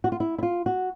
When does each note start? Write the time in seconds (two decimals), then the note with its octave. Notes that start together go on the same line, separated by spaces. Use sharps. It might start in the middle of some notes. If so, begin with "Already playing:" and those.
0.04 F#4
0.12 F4
0.20 E4
0.38 E4
0.43 F4
0.66 F#4